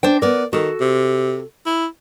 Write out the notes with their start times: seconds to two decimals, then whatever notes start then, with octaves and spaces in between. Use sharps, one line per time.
0.03 D4 C5 G5
0.22 B3 A#4 D5
0.53 D#3 F#4 A4
0.80 C3
1.66 E4